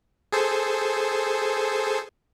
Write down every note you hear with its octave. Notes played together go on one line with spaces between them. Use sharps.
G#4 A4 C5